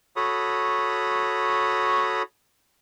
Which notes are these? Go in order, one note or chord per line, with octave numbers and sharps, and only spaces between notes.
F#4 A4 C#5 B5 D#6